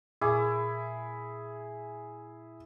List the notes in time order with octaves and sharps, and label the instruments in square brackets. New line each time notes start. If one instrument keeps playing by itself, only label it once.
[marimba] A#2 C#6 D6 [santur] E4 [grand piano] G#4